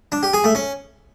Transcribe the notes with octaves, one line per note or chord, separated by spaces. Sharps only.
D4
G4
G#4
A3
C#4